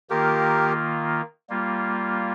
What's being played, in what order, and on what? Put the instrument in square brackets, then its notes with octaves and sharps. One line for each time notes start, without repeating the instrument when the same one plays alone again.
[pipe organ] D#3 A#3 F4 [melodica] G4 A#4
[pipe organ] G3 A#3 F4